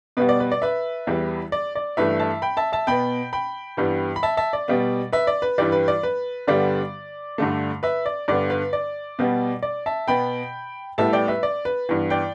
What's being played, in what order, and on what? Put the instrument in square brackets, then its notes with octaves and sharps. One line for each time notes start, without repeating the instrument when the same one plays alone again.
[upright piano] B2 G3 B3 B4
D5
B4
D5
B4 E5
E2 E3 G3
D5
D5
G2 E3 A3 B4 E5
E5 A5
G5 B5
E5 A5
E5 A5
B2 B3 G5 B5
G5 B5
G2 E3 G3 B3
B5
E5 A5
E5 A5
D5
B2 G3 B3
B4 E5
D5
B4
G2 E3 G3 D5
B4
D5
B4
G2 D3 G3 B3 D5
G2 D3 A3
B4 E5
D5
G2 D3 B3 D5
B4
D5
B2 G3 B3
D5
E5 A5
B2 B3 G5 B5
A2 G3 B3 E5 A5
D5 G5
B4 E5
D5
B4
G2 E3 B3
D5 G5